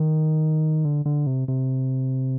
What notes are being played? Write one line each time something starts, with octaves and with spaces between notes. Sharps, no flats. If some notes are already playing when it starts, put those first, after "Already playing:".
Already playing: D#3
D3
D3
C3
C3